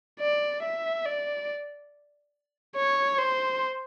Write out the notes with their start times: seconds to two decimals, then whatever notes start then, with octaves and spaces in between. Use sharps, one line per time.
0.20 D5
0.62 E5
1.06 D5
2.76 C#5
3.18 C5